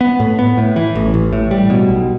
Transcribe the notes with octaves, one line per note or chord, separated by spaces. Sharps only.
B3
A2
B3
A2
E3
A1
A1
A2
G3
B2
B1